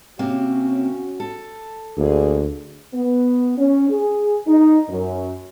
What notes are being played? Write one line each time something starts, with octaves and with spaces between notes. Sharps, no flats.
C3 A#3 C4 C#4 F#4
A4
D2 D3 A#3 G#4
B3
C#4
G#4
D#4
F#2